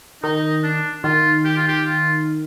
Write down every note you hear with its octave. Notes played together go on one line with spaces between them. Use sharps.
D#3 D#4
D4
D#3 F4
G4
F4
G4
F4